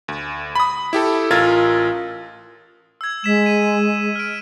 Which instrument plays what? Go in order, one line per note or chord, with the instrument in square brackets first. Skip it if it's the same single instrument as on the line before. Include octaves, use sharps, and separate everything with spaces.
[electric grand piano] D2
B5 D#6
E4 G4 A4
A1 F4 A#4 E6 G#6 A6
[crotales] E6 G#6
[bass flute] G#3 [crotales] B6 E7
[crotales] D#7
F6 D7